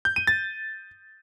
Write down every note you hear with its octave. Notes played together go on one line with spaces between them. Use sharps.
G6
D#7
A6